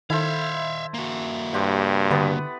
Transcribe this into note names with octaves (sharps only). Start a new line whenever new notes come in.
D#3 E4 A4 C5 E5 F5
A#3 F#4
G2 G4 C5 F#5
D3 B3 B4 D5